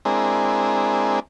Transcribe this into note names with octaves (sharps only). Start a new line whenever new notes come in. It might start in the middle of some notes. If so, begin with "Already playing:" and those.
G#3 C4 D4 E4 G#4 A#4